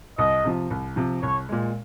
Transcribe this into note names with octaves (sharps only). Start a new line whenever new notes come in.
C2 D#5
C3 F3
C2
C3 F3
C2 C#5
A#2 G#3